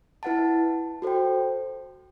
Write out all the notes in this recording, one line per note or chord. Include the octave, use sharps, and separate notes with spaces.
E4 B4 F#5 A5
F#4 A4 C5 G5